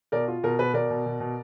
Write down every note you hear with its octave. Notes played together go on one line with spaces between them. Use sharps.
B2 A#4 D5
F4
B2 A#4
B2 B4
B2 A#4 D5
B2
B2
B2